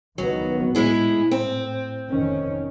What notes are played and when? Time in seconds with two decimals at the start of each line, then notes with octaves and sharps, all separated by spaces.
0.18 C#2 D#3 F#3 B3
0.75 A2 G#3 E4 G#4
1.31 C4
2.11 F1 D#3 C#4